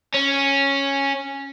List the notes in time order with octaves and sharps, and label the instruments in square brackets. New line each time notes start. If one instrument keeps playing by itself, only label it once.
[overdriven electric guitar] C#4